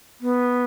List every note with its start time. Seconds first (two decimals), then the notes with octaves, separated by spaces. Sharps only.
0.21 B3